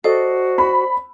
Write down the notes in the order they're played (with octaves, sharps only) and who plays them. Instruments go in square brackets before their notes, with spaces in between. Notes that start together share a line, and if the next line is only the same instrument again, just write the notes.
[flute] F#4 [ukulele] A4 D5 D#5 [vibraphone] C5
[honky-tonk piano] B5